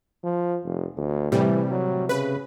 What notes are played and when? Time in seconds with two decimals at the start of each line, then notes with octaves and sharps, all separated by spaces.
0.24 F3
0.65 F1
0.97 D2
1.32 A2 C3 E3 G3
1.71 F#3
2.09 C#3 B4